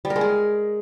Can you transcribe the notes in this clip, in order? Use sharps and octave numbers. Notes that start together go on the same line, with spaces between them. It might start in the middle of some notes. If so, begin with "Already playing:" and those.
G3
A#4
G#3
G#4